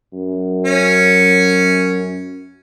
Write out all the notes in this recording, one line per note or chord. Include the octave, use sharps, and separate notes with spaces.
F#2
C#4